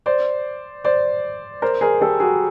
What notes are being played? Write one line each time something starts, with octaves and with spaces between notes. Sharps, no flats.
C5 D5
C5 D5
A#4 C5
G#4 A#4
G4 A4
F#4 G#4